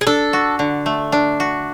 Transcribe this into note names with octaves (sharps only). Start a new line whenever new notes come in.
G#4
D4 A4
F#4
D3
A3
D4
F#4